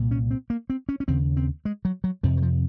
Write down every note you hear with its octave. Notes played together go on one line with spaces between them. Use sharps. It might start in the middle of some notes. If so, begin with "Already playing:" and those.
Already playing: C2 A#2
C#4
C4
A#3
C4
C#4
C#4
D#2 C#3 C4
C4
G#3
F#3
F#3
F2 C3 F3
D#3
F3